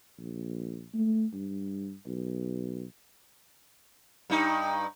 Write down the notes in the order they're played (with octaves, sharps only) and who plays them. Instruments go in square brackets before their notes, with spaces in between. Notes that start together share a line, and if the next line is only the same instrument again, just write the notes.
[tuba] A#1
A3
G2
B1
[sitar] G2 D#4